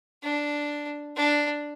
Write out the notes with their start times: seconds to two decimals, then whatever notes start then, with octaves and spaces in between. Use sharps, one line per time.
0.23 D4
1.16 D4